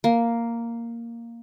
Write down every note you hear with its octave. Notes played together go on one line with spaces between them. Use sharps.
A#3